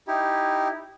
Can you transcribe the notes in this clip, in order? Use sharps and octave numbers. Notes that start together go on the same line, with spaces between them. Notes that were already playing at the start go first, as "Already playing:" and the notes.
D#4 E4 G4